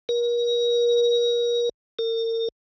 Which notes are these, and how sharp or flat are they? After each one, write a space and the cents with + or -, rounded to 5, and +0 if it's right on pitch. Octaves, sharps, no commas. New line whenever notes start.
A#4 +35
A#4 -40